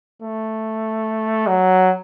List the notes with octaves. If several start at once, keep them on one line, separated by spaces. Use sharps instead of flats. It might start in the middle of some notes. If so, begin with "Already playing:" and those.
A3
F#3